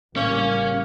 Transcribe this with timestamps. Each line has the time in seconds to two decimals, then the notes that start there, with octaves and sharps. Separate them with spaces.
0.16 A1 C#3 G3 A#3 C#4 C#5